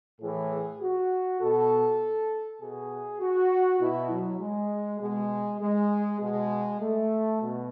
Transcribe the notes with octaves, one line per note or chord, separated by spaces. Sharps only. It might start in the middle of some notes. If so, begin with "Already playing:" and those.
A2 E3 G#4
F#4
B2 A4
B2 G#4
F#4
B2 E4
F#3
G#3
B2 G#3
G#3
B2 G#3
A3
B2